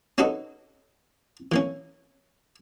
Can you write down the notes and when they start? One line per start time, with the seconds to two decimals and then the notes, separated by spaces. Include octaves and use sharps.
0.18 C#4 D#4 F#4 A4 B4 D#5
1.52 E3 A#3 C#4